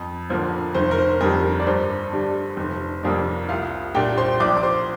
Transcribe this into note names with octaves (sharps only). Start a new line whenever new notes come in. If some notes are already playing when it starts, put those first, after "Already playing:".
Already playing: F2
D3 F3 A#3
F1 C5
A#4
C5
F2 D3 G3 A#4
A#4
D5
G2 C5
D3 G3 D4
F1
F2 C3 A#3 D4
C2 F4 F5
A#2 G3 D4 G4 G5
C5 C6
A#1 D5 D6
D6
C5 C6